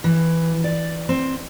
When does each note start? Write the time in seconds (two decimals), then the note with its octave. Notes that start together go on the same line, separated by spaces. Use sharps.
0.04 E3
0.64 D5
1.09 C4